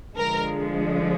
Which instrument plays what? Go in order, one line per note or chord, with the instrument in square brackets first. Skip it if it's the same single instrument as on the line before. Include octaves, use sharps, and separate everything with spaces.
[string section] D3 F3 G#3 A#4